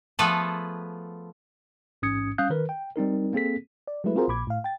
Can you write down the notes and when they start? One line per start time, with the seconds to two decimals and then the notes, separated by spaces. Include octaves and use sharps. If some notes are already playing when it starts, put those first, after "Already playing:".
0.19 F3 A3 B3 G#4 A4 B4
2.02 A1 G#2 C#4 D#6 G#6 C#7
2.38 G3 C#4 F5 D#6 F#6 G6
2.50 D#3 A#4 B4
2.69 G5
2.96 G3 C4 D#4 A#4
3.33 A#3 C4 G#4 A4 B6
3.87 D5
4.04 F#3 G#3 A3 E4 B4
4.15 C4 F4 F#4 G#4 A#4 C5
4.28 A#1 A#2 B5 D6 G#6
4.47 A2 F5
4.64 G5 A6